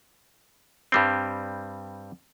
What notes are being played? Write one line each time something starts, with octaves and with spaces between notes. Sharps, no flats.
G2 G3 C4